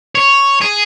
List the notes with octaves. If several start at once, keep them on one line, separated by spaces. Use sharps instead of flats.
C#5
G#4